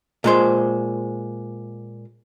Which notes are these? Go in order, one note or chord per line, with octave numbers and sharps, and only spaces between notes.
A#2 G#3 C5